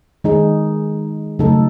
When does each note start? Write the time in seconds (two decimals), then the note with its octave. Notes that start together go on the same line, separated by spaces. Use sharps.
0.24 D#3 G#3 D#4 G#4
1.39 C#3 F#3 A3 D#4 A4